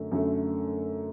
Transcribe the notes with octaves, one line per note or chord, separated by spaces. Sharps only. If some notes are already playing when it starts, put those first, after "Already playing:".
Already playing: F#2 D3 A3
F#2 D3 A3